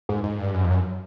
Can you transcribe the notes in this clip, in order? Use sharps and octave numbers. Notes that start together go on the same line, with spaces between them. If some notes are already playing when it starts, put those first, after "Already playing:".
G#2
G#2
G2
F#2
F2
F#2